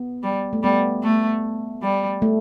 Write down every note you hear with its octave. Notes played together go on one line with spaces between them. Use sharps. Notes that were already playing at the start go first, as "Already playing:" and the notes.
Already playing: B3
G3
A3
G3 B3
A3
G3
A3